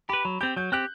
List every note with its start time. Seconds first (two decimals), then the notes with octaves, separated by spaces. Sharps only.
0.09 G4 B4 B5
0.25 F#3 B5
0.41 C4 G4 G6
0.56 F#3 G6
0.72 C4 G4 F#6